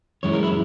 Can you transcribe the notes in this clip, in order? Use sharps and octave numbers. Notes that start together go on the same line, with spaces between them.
F#2 E3 G#3 C#5
A#4
E4